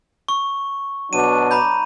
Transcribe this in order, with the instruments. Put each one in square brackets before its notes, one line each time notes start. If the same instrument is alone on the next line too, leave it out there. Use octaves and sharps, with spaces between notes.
[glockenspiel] C#6
[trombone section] B2 F#3 D4 [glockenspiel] D#7
[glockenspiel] A#5 B5 G6